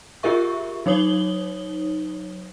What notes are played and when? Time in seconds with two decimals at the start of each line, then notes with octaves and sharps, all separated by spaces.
0.23 F4 G4 G#4 A#4 E5 C#6
0.86 F#3 D#4 C#5 D#6 F#7 G7